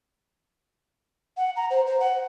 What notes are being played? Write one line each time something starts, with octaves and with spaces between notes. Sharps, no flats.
F#5
A#5
C5
C5
F#5